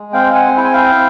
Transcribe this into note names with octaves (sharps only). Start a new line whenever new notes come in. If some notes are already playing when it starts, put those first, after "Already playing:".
Already playing: G#3
C4 F5 G5
F#5 G#5
E4 G5
G#5
F5 G5